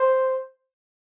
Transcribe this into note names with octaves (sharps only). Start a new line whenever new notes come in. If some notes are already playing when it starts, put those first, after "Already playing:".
Already playing: C5